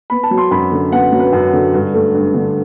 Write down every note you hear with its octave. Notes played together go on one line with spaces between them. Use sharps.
B3 B5
A5
F#3
C6
F#2 B5
D3
B3 F#5
F#3
B4
F#2
D3
G2
A3
G2
D3